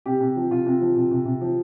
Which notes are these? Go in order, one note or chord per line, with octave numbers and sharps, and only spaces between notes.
C3 G4
C3
F3
C3 F4
C3
F3
C3
C3
C3
F3